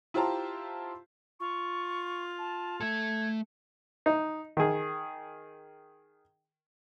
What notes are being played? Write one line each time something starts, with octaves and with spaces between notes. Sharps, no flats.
E4 F4 G4 C5 A5 A#5
F4 C#6
A5
A3 A4 G#6
D#4
D#3 G#4